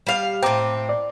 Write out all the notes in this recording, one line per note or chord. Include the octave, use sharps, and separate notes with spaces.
G3 F5
A2 C4 G5 A#5 D6
D5